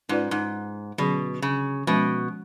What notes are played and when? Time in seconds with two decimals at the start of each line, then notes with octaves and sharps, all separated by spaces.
0.09 G#2 C#4 F4 B4 D5
0.31 G#2
0.98 B2 D3 F#3 C#4 G#4
1.42 C#3
1.87 B2 F3 G#3 C#4